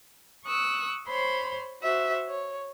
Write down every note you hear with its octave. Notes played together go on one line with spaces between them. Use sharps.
C#6 D#6 E6 F#6
C5 C#5 B5 C6
F#4 C5 E5
C#5